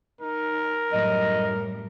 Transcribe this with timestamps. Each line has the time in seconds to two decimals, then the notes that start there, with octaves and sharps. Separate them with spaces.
0.21 D#4 A#4
0.93 F#2 A2 G3 D#5